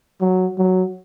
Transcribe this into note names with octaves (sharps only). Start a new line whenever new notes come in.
F#3
F#3